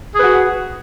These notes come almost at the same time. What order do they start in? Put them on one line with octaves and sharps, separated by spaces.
G#4 B4 F#4